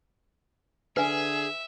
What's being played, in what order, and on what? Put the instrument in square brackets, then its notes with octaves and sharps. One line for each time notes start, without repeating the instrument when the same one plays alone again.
[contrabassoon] D3 [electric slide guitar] G#4 [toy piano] B4 G#5 [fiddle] E5